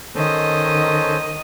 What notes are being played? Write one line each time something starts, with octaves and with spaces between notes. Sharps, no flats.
D#3 C#4 A4 C5 D#5